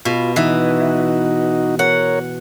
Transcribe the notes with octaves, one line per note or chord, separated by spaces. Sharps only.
B2 F4
E3 D#4 F#4
A#4 C#5 F#5